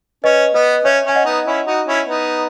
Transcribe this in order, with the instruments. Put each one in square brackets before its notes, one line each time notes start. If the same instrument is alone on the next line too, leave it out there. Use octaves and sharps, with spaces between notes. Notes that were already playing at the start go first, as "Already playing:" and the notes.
[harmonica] C#4 [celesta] B4 D#5
[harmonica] B3 [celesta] B4 D#5
[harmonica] C#4 [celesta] C#5 E5
[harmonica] C#4 [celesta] G#5
[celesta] D#5 F#5
[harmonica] B3 D#4
C#4 E4
D#4 F#4
C#4 E4
B3 D#4